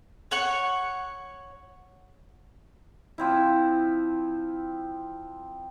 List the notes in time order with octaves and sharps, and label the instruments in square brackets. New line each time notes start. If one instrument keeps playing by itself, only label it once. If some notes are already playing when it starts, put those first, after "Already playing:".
[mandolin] C#5 F#5 C#6
[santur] F3 C4 E4